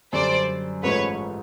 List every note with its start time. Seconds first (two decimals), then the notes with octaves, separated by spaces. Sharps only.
0.13 F#2 D3 G3 C5 D5
0.83 A1 G#2 F3 A3 B4 C#5